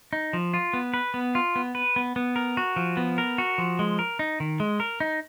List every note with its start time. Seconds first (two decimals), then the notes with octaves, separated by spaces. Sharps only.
0.13 D#4
0.33 F3
0.54 F4
0.73 B3
0.94 B4
1.14 B3
1.35 F4
1.56 B3
1.75 B4
1.96 B3
2.16 B3
2.36 A#4
2.57 F#4
2.76 F3
2.97 B3
3.18 A#4
3.38 F#4
3.58 F3
3.79 G#3
3.99 A#4
4.19 D#4
4.40 D#3
4.60 G#3
4.80 A#4
5.00 D#4